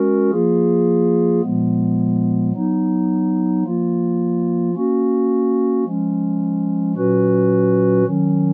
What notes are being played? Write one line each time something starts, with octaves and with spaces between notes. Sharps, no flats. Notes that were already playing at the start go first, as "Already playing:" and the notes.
Already playing: G#3 C#4 F#4 A#4
F3 A#3 F4 G#4
A#2 F3 G#3 B3
F#3 B3 D#4
F3 A#3 F4
A#3 C#4 F#4
F3 G#3 C#4
A#2 F#3 C#4 F#4 B4
D#3 F#3 C#4